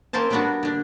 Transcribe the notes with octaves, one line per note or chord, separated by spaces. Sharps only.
A#3 C4 C#4 C5 A5
G3 A#3 B3 D4 F#4
D3 D4